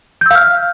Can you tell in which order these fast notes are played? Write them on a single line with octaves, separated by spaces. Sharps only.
G6 E6 F5 F6